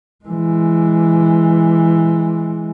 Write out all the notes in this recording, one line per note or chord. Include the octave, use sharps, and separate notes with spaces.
E3 G#3